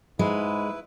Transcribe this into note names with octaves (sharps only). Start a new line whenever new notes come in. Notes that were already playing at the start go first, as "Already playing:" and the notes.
G#2 G#3 E4 B4